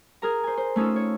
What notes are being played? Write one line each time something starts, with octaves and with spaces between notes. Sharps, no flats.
G#4 A#4 A#5
C5 G#5
C5
A3 C#4 D#4 F4 A4
C#5